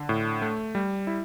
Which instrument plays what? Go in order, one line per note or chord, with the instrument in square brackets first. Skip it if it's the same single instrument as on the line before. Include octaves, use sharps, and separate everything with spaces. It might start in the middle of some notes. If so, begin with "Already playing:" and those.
Already playing: [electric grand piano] D3
A2
A3
G3
E4